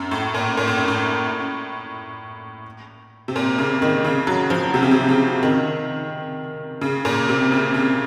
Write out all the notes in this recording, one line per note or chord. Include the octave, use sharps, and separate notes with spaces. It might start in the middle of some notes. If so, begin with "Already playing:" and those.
Already playing: F#2
A2
A#2
A#2
A2
F#2
A2
C3
A#2
C#3
D#3
C#3
F#3
F3
C3
C#3
C3
C#3
D#3
C#3
A#2
C3
C#3
C#3